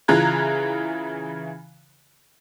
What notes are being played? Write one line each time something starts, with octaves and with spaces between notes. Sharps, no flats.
C#3 E3 F4 A#5 F#6 G#6